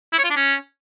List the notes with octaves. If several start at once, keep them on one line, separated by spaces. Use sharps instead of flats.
E4
C#5
F4
D4
C#4